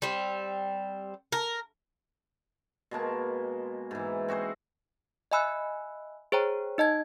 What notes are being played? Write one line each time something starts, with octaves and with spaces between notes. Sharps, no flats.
G3 C4
A#4
B2 G#3 A#3 A5
G#2 E3
C4 F#4 G#4 C5
D#5 E5 G#5 B5 E6 F#6
G#4 C5 C#5 G5 A#5
D#4 D#5 A5 G#6